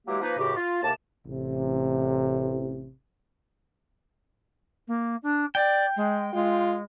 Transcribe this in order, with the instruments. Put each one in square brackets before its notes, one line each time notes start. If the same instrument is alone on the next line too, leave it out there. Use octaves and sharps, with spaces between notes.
[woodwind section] E3 F#3 G#3 A#3 G4
F3 A#3 D#4 B4
C#2 F#2 A2 C#3 F#4 G4
F4
D#2 A2 C3 A#3 A5
[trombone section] A1 C3
[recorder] A#3
D4
[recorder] D5 [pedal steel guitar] G5
[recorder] G#3
[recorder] G#3 [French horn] F4